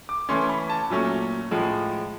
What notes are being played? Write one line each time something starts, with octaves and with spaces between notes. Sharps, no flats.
D6
E3 A3 C#4 C6
B5
A5
A#2 F#3 A3 C#4
A2 F3 G#3